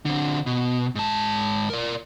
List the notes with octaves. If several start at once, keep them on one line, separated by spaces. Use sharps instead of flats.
D3 C4
B2
G#2 A5
A#4 D5